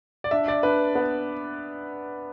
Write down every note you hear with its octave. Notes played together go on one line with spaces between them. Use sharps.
D5
D4 E5
D5
D4 B4
B3